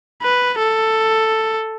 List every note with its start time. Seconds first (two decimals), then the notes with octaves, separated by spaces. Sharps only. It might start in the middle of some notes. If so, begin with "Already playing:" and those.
0.22 B4
0.59 A4